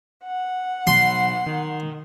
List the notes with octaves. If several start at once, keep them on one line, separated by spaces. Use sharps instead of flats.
F#5
B2 F#3 C6
D#3